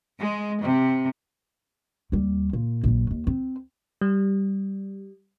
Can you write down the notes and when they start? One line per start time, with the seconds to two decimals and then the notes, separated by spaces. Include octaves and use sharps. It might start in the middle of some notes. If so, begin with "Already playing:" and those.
0.18 G#3
0.62 C3
2.12 D#2 G3
2.53 A#2
2.84 A#1 F#3
3.11 D#2
3.27 C4
4.01 G3